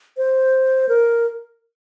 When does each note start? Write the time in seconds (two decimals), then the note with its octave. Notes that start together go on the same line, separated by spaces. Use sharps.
0.17 C5
0.89 A#4